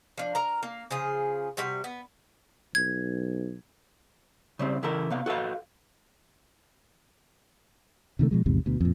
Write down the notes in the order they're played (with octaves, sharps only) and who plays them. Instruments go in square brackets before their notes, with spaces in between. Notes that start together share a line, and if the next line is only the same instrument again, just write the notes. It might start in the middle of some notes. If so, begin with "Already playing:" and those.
[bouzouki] F3 D4
A#4 A#5
A#3
C#3 F3 G#4
C3 G3 F#4 G5
B3
[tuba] B1 [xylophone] G#6
[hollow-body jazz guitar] C#3 G3 C4
C#3 E3 E4 A4 A#4
C3 B3 F5
F#4 A4 B4 F5
[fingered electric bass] C3 D#3 F3 A3
B2 F3 G#3
A#1 E2 G#2 C3
D2 B2
F2 A#2